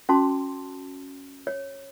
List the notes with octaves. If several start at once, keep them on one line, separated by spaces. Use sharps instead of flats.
C#4 F#4 A5 C6 D6
C#5